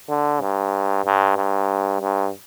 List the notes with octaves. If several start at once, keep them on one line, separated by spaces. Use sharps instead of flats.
D3
G2
G2
G2
G2